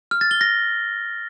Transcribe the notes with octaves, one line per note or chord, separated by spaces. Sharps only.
F6
A6
G7
A#6